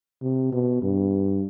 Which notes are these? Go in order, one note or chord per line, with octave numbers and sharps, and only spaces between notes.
C3
B2
G2